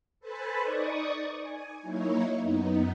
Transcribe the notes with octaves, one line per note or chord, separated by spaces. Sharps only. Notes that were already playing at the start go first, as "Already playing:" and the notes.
A4 B4 C5 G#5 A5 B5
D#4 D5 C#6 D#6
G#5
F#3 A#3 D#4 E4 C#5
F#2 B3 D#4